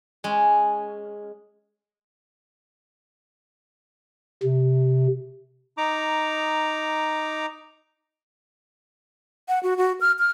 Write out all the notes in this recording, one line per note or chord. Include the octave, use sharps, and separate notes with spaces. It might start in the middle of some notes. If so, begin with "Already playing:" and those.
G#3 C#4
C3
D#4 A#5 D6
F#5
F#4
F#4
F6
F6